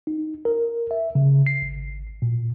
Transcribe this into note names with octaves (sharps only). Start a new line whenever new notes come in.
D#4
A#4
E5
C#3
C7
G#1
A#2